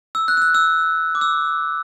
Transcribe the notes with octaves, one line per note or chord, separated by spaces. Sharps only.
E6
F#6
E6
F#6
E6
D6
E6